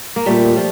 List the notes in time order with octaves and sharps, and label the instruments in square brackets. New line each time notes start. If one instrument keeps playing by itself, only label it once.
[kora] A#3
[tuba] A#2 [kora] G3 A3
[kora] F3